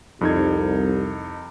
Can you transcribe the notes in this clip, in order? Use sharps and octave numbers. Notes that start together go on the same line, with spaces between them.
C2 F2 D#4 G#6